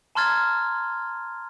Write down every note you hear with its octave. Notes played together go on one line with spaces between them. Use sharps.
A5 A#5 C6 F6 G#6 A6